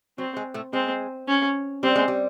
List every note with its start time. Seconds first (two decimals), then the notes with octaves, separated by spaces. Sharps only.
0.18 F#3 C4
0.37 G#3
0.54 A2 A3
0.73 G#3 C4
1.28 C#4
1.83 G3 C4
1.96 G#3
2.08 G3